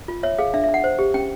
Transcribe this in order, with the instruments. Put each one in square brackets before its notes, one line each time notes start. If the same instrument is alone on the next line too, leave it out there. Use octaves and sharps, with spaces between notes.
[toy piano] F4
C#5 E5
G#4 F5
D4 E5
D4 E5
F#5
C5
G4
C#4 G5